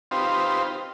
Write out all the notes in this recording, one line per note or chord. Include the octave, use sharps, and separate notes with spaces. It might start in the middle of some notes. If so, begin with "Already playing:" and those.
C4 D#4 F4 G4 B4 C5